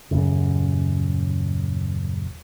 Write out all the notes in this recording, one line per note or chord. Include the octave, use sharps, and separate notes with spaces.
D#1 F#2 C#3